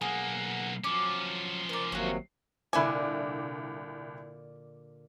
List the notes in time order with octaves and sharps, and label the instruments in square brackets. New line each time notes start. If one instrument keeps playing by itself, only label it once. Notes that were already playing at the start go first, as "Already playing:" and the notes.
[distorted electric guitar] B1 A#3 [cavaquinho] G#4 [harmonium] F#5
[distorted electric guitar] F3 C#4 [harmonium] F#3 [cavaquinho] D6
[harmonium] A#4 [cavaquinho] C5 D5
[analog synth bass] G#1 [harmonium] C3 F#3 A#3 [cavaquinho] F#4 C#5
[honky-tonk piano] C2 D6 [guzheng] A#2 D3 [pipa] E4 G#5